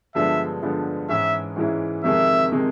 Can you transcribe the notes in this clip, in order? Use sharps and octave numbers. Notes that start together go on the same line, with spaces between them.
G2 D3 F3 G#3 B3 E5
G2 D3 F3 G#3 B3
G#2 E3 G#3 C#4 E4 E5
G#2 E3 G#3 C#4 E4
F2 C3 D#3 G#3 E5
C3 D#3 G#3